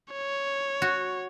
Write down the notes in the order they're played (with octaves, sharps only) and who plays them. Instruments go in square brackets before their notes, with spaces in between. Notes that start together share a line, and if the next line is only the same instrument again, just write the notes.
[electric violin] C#5
[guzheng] F#4